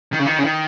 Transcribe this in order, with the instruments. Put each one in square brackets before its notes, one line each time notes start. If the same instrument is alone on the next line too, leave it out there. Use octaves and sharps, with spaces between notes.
[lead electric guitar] D#3
C#3
D#3
C#3
D#3